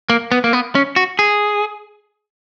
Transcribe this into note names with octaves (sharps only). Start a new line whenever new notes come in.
A#3
B3
A#3
B3
C#4
F#4
G#4